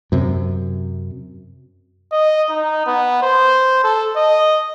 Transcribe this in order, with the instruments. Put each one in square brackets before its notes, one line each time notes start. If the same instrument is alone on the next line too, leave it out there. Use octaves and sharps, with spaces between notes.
[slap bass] F#2 C3
[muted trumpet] D#5
D#4
B3
C5
A4
D#5